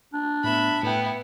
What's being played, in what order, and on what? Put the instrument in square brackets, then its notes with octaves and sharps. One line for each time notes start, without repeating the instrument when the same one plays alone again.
[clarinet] D4
[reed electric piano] A2 B3 [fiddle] E5 B5
[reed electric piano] A2 G5 [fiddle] B3 E4